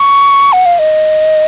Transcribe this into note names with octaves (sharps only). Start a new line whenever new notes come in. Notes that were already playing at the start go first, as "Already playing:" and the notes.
Already playing: C#6
F#5
F5
D#5